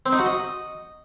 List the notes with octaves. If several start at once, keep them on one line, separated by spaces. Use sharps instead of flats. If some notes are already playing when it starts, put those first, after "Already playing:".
C4
D#4
F#4
D#5